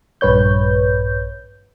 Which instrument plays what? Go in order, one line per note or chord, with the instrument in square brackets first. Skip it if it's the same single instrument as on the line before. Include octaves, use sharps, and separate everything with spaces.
[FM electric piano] A#1 G2 B4 C#5 G6